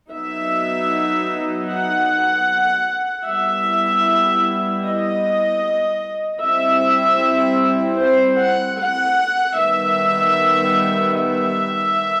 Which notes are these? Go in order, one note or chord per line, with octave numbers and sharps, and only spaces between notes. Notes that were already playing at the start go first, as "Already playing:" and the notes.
F#3 B3 D#4 E5
F#5
G3 B3 E4 E5
D#5
G3 C4 E4 E5
C5
F#5
F#5
D#3 G3 B3 E5
E5